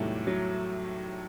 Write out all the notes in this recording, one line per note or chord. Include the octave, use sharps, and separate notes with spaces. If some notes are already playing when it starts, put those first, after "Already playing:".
Already playing: E2 A2 C3 D#3 F#3 G3 A3
F#3